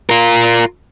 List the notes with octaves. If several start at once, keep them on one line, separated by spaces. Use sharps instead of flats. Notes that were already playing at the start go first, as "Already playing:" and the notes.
F4 A#4